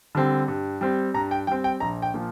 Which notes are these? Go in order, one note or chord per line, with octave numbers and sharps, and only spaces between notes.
D3 G3 C4
G2
G3 C4
G2 A#5
G5
G3 C4 G5
G5
A#1 A#5
G5
A#2 F3